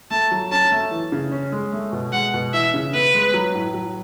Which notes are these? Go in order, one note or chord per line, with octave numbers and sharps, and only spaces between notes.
A3 A5
F#3
C#4 A5
A3
E3
C#3
C#4
G#3
A3
B2
G#3 F#5
B2
E3 E5
C#3
B3 B4
G#3
F#3
A2
F#3